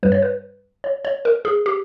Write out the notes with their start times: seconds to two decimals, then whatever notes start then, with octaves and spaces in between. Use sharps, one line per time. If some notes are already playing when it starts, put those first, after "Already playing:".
0.03 G2 G3 B4
0.12 C#5
0.22 B4
0.84 C#5
1.05 C#5
1.25 A#4
1.45 G#4
1.66 G4